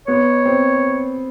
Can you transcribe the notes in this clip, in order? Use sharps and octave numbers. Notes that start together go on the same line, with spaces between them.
B3 C#5
C4